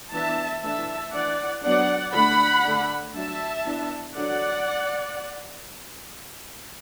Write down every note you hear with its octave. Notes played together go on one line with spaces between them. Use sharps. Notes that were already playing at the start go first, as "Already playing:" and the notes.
E3 B3 D4 E5 A5
E3 A3 D4 E5 A5
E3 D4 D5 F#5
F#3 B3 D4 D5 F#5
D3 A3 D4 F#5 B5
D3 A3 D4
F#3 D4 E5 A5
E3 B3 D4
D3 F#3 D4 D5 F#5